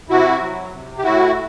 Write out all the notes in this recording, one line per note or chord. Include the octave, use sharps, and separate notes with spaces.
C3 E4 F#4
F#3
C3
G4
A2 E4 F#4